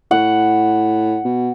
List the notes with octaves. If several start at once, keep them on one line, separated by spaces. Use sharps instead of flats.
A2 F#5
B2